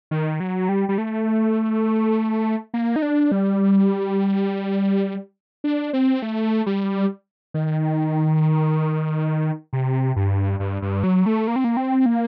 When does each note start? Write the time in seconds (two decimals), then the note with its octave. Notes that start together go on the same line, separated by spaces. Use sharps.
0.11 D#3
0.40 F#3
0.69 G3
0.89 G3
0.98 A3
2.74 A#3
2.96 D#4
3.02 D4
3.32 G3
5.64 D4
5.93 C4
6.22 A3
6.66 G3
7.54 D#3
9.73 C3
10.16 G2
10.60 G2
10.82 G2
11.04 F#3
11.26 A3
11.47 A#3
11.56 C4
11.64 A#3
11.77 C4
12.06 A#3